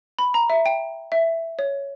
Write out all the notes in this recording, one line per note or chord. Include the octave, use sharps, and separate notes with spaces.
B5
A#5
E5
G5
E5
C#5